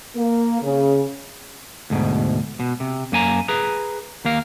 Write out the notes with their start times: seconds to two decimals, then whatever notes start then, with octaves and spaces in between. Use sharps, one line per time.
0.15 A#3
0.62 C#3
1.90 D2 G#2 B2
2.60 B2
2.80 C3
3.12 F#2 A#3 G#5 A#5
3.48 G#4 B4 A#5
4.25 D#2 A#3 F5